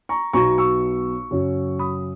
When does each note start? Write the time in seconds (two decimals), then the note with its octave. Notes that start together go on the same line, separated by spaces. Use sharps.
0.09 A#5 C#6
0.33 B1 B2 F#3 B3 A#5 C#6
0.58 C#6 E6
1.31 F#2 C#3 F#3 C#4
1.79 B5 D#6